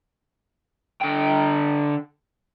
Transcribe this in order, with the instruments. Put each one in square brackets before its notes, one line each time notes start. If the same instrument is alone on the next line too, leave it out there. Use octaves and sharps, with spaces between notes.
[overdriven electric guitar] D3 G5